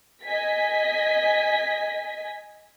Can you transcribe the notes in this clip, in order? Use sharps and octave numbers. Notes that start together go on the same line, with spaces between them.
D#5 G#5 B6